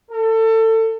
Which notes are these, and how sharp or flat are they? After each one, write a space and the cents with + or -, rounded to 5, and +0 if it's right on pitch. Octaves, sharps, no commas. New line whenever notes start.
A4 +25